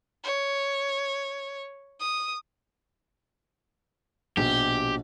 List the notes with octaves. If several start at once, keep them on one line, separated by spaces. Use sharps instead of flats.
C#5
D#6
A#1 B2 G4